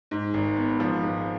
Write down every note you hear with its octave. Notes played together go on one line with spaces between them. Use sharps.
G#2
G#1
B3
F3
G#2